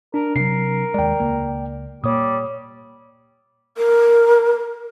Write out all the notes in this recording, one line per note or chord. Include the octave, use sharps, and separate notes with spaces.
D4 A#4
C3 F#3 D4 A#4 C7
D#2 G#3 D5 G5
C#2 A#3
A#2 G3 A#3 C#5 D#6
A#4